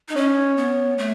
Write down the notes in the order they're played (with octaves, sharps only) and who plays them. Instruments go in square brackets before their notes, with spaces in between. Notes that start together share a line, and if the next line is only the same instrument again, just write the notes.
[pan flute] D#4 [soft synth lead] D#5
[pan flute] C#4 [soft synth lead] C#5
[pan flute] B3
A3